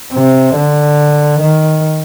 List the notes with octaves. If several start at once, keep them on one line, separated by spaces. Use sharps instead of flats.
C3
D3
D#3